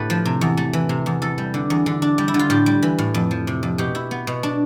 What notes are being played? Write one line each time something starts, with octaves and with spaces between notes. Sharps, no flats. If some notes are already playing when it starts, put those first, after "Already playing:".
Already playing: A2 D3 A3 B3 G4 B4
F3
C3
E2
A3
E3
C3
E2
E2 A4
G3
D3
E2
D3
D4
G3
E4
D3
F4
A2 G4
G3
E3
A2
F2
F3
C3
F2
B2 G4
E4
B3
B2
D4